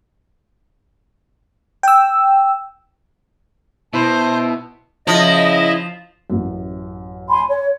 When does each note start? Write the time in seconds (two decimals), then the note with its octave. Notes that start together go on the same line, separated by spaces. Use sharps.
1.83 G5 E6
3.93 B2 E4 C5 E5 A5
5.07 C#3 F3 E4 D#5
6.30 A1 F#2
7.28 G#5 B5 C6
7.47 C#5